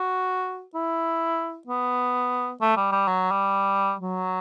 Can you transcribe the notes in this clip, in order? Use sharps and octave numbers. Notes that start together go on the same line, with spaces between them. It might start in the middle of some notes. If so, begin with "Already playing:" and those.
Already playing: F#4
E4
B3
A3
G3
G3
F#3
G3
F#3